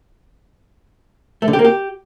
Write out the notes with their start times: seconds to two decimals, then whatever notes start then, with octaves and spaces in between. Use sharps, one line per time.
1.42 A3
1.48 D3
1.53 G4
1.59 A#3
1.65 G4